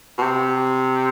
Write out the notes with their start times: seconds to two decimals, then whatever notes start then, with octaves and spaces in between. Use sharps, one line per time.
0.18 B2
0.22 C3